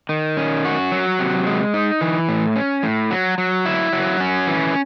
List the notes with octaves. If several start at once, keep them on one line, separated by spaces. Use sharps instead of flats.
D#3
C#4
F#4
F#3
C3
G#3
D#4
E3
A2
C#4
A2
F#3
F#3
E4
F#3
C#4
E3